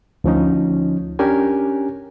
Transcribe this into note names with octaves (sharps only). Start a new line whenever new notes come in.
D2 F3 C#4 D#4
C#4 D4 G4 A#4 G#5